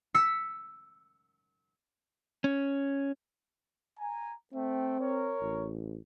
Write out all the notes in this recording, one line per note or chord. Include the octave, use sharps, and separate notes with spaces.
E6 B6 C#7
C#4
G#5 A#5
A3 C4 E5 G5
A#4 C#5
A1